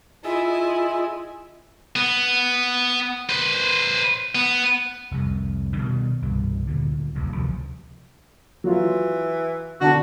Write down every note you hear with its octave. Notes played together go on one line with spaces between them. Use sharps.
E4 F4 G#4 D#5 G#5 E6
B3
B4 C5
B3
F1 C2
B2 D3 D#3 G3
C2 G2 B2
D2 A#2 D3
D#1 A#1 F2 C#3
D2 C3 F3 F#3
E3 F#3 F4
D3 D4 F#4 A5